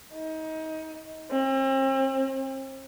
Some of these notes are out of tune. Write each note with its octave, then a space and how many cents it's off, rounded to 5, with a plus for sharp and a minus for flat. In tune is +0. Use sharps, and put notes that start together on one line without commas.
D#4 +25
C4 +40